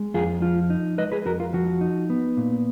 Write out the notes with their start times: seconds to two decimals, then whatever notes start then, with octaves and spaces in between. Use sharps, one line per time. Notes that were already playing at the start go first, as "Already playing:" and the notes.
Already playing: G#3
0.14 F2 F4 G#4
0.42 F3 F4
0.70 D#4
0.98 G#3 B4 D#5
1.12 G#4 B4
1.25 F2 F#4 A#4
1.40 F4
1.53 F3 F#4
1.81 D#4
2.10 B3
2.37 A#2